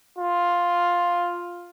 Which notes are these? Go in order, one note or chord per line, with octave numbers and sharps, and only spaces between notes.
F4